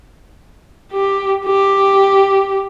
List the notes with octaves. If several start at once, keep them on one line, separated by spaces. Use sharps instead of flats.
G4
G4